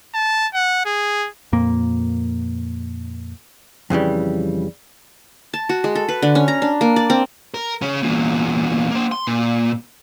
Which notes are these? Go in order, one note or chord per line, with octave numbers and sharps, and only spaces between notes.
A5
F#5
G#4
F2 A#2 A#3
F2 C#3 E3 G3
A5
F#4
G#3
A4
B4
D3
C#4
A#5
D4
A#3
D5
C4
A#4
C#3 C#4
E2 A#2
A#3 C5
C6
A#2